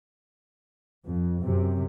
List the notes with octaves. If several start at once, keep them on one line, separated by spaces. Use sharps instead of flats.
F2
F#2 C3